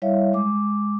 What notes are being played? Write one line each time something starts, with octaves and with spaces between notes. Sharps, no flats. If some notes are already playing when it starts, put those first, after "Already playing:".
G3 E4 C#5 E5 F5
G#3 D6